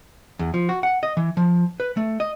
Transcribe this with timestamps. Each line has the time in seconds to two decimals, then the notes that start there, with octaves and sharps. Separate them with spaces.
0.39 E2
0.54 F3
0.69 F#4
0.83 F#5
1.03 D#5
1.17 E3
1.37 F3
1.80 B4
1.97 A3
2.20 D#5